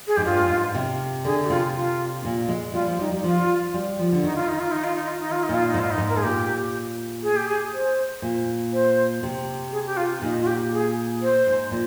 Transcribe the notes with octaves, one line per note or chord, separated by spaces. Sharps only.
G#4
G#2 G4
G2 F4
G#2
C3
D3 G#4
G4
C3 F4
F4
A#2
G#3
G3 F4
F3
G3 D#4
G3
F3 F4
G3
F3
D3
D#3 D#4
F4
D#4
F4
D#4
F4
D#4
F4
D#4
F4
D#4
A#2
F4
D#4
G#2
F4
D#4
G#2
A#4
G#4
A#2 G4
G#4
G4
G#4
C5
A#2
C5
C3
G#4
G4
F4
A#2 D#4
F4
G4
G#4
C5
G#2
A#2